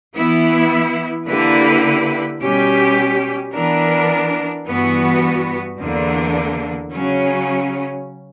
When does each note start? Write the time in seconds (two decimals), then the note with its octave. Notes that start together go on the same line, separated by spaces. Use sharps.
0.15 E3 B3 E4
1.27 D3 A#3 E4 G4 B4
2.40 B2 G3 C#4 G4
3.53 E3 B3 D4 A#4
4.65 G2 E3 B3 F#4
5.78 E2 D3 A#3
6.91 C#3 F#3 C#4